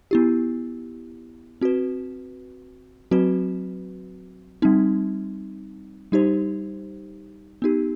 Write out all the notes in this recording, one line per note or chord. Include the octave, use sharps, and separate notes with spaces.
B3 E4 G4
C4 F#4 B4
F#3 C4 F#4 B4
G3 C4 D#4
G3 D#4 G4 C5
B3 D#4 G4